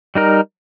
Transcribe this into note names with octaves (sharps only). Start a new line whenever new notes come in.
G3 D#4 A#4